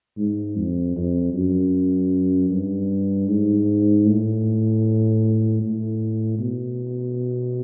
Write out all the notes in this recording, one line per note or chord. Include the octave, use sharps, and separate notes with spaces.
G#2
F2
F2
F#2
G2
G#2
A2
A2
B2